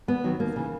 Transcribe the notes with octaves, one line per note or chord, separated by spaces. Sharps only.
E2 B3
D#3 F#3
D#2 A#3
C#3 E3